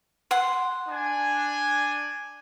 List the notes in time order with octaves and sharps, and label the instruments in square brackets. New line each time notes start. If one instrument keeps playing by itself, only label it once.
[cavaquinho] F#5 C6
[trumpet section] D4 G#5